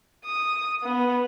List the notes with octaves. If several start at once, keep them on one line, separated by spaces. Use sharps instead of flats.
D#6
B3